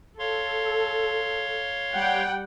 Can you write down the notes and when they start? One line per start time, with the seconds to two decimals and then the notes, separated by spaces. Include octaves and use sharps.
0.19 A4 C#5 F5 C6
1.95 G3 F#5 G5